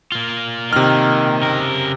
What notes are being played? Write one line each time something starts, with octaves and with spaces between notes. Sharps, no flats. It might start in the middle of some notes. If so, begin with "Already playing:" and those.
A#3 F4
C3 D#3 F6
C#3 A#4